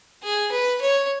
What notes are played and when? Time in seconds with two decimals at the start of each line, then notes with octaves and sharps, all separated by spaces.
0.23 G#4
0.51 B4
0.81 C#5